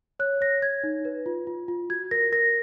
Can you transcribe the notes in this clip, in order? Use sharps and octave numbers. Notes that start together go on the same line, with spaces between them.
C#5 F#6
C#5 A#6
C#5 G#6
D#4
B4
F4
F4
F4
F#4 G#6
A#4 A#6
A#4 A#6